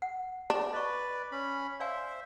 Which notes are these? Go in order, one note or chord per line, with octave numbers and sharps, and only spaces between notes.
F#5
D4
B4 D5 D#5 C#6
C#4 B5
C5 D5 E5 F5 G#5